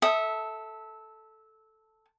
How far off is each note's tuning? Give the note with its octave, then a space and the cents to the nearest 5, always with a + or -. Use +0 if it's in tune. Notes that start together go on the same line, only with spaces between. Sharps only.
A4 +0 E5 -15 D#6 +0